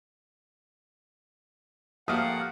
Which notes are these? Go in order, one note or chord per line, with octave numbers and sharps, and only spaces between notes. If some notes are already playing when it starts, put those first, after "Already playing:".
F3 A3 A#3 G4 F5 F#5 D#6